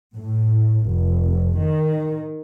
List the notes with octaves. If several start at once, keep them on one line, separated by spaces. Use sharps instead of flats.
A2
F1
D#3